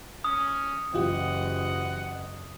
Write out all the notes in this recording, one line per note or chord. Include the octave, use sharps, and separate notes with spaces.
C#4 D#6
F#1 E3 F4 G4 D#5 F#5